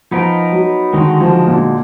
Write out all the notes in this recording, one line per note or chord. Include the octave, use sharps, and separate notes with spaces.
F3 B3 D#4 A#4
F#3
D3 D#3 G#3 D#4 F#4
F3
A#2